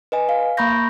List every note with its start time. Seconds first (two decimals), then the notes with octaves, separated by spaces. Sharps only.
0.12 B4 D#5 G#5
0.29 F5
0.57 A#3 A#5 B5 C#6 G6 A#6